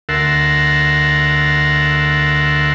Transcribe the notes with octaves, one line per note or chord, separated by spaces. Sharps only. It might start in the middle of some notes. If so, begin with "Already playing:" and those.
D2 A#4 E5 F#5 A5 C6